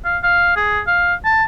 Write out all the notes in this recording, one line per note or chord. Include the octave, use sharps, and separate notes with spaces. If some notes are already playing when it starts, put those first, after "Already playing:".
F5
F5
G#4
F5
A5